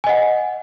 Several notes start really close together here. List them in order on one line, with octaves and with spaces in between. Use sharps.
G#5 D#5 F#5